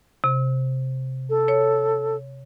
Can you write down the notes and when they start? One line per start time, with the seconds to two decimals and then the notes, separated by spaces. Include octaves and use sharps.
0.24 C3
1.30 A4
1.48 C#5